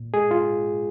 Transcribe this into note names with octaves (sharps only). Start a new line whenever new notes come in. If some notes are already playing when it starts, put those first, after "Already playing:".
Already playing: A#2
G#3 G#4
F4